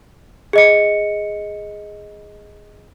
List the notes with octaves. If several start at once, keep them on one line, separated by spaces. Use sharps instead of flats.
G#4 D#5 C#7